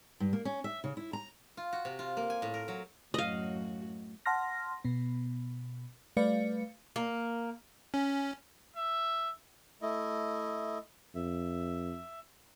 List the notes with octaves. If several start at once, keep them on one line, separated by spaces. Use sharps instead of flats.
G2
A#3
C#4
E5
C#3
E4
A#5
F4
F#4
C3
F4
A#3
G#5
A2
A#4
F#3
F#2 A2 F#4 D#5 F5
F#5 A5 C6 F6 A#6
B2 B3
G3 A3 B4 D5 F5 C#7
A#3
C#4
E5
A3 E4 D#5
F2 E5